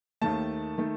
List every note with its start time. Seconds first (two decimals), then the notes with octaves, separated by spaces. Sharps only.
0.21 D#2 D#3 A3 A5
0.78 D#3 A3